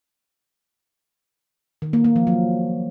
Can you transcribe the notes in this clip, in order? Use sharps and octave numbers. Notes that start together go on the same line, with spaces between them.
D#3
A#3
A#3
F3
F#3